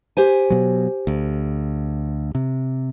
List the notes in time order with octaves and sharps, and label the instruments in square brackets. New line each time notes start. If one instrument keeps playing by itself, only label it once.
[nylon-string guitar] G4 C5 G#5
[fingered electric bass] B2 F#3
D2
C3